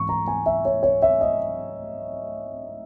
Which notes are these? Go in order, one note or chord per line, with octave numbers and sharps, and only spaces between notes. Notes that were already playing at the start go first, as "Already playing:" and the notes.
Already playing: G#2 E3 C#6
A#5
G#5
E5
C#5
C#5
E5
D#5